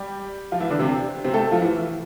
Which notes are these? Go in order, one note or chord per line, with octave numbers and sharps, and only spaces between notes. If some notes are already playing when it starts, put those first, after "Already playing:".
Already playing: G3 G4
F3 F4
E3 E4
D3 D4
C3 C4
C3 C4
A3 A4
F3 F4
E3 E4